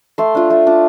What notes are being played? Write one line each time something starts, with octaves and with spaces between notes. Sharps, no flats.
A3 C6
D4 F4
A3
D4 F4